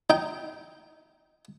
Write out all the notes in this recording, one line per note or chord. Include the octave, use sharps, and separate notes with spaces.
D#4 G5